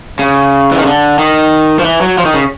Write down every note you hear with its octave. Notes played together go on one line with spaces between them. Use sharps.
C#3
E3
D#3
D3
D#3
F3
E3
F#3
F3
D#3
C#3